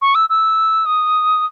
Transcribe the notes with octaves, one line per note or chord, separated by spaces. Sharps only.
C#6
E6
E6
D#6